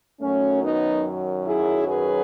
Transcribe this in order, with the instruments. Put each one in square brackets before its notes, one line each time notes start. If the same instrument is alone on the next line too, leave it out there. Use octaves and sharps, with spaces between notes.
[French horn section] F#2 D#3 F#3 A3 C#4
B3 D#4
E4 G#4
G#4 B4